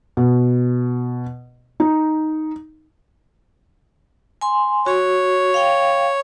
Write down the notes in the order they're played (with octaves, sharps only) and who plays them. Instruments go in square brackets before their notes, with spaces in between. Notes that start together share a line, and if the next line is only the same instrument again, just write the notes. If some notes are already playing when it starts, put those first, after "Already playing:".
[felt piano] B2
D#4
[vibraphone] G#5 C6
[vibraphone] F#4 [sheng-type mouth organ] C#5
[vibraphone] F5 G5